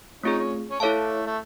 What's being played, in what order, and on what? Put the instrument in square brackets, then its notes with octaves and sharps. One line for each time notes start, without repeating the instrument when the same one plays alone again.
[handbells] A3 C4 F4 G#4 [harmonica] C#4 D#4
[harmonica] C#4
C#4
[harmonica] A3 [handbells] E4 A4 C#5 F5 A5
[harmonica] A3